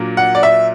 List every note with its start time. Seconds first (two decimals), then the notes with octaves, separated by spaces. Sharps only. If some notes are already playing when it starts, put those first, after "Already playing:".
Already playing: A#2 F#3 A#3 D4
0.17 F#5
0.35 D5
0.43 E5